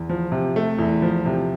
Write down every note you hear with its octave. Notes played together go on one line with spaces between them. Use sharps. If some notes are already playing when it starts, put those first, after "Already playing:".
Already playing: E2
F3
C3
A3
E2
F3
C3